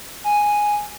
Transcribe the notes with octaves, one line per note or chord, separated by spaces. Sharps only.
G#5